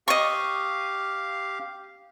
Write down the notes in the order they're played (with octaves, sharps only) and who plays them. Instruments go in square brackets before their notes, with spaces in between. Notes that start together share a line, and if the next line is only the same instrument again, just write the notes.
[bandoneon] G4 F5 [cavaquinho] D#5 C#6